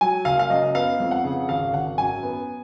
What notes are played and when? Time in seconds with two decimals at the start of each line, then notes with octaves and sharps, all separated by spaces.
0.01 F#3 G#5
0.25 F#1 F5
0.39 F5
0.50 F#2 D#5
0.75 B3 F5
1.00 F2
1.11 F#5
1.24 C#3
1.49 G#1 F5
1.74 G#1 F#5
1.98 F#2 G#5
2.23 B3